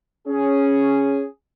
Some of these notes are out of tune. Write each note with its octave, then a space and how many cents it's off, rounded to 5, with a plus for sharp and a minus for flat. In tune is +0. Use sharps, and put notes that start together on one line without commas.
C#4 +0 G#4 +0